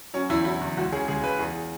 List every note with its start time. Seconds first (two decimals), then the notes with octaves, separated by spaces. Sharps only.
0.14 F#3 C#4
0.29 E2 E4
0.45 F#3 E4
0.61 E2
0.77 C#2 F#4
0.92 C#3 G#4
1.08 C#2 G#4
1.23 C#3 B4
1.39 E2 G#4